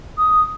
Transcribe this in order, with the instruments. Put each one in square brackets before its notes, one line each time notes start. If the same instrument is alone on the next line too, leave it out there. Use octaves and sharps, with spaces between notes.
[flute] D#6